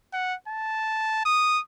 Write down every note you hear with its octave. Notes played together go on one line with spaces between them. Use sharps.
F#5
A5
D#6